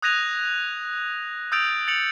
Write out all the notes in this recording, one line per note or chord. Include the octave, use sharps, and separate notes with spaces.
D#6 F#6 G#6 A#6 D#7 F7
D#6 E6 G6 A6 D7 F7
A6 C#7 F7 F#7